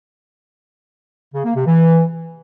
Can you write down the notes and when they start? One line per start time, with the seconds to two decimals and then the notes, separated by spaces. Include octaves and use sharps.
1.34 C#3
1.45 A#3
1.56 C3
1.66 E3